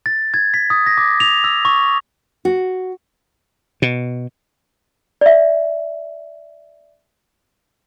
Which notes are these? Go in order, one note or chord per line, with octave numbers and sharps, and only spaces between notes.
A6
G#6
B6
D#6
A#6
D6
F7
E6
C#6
F#4
B2
D5 E5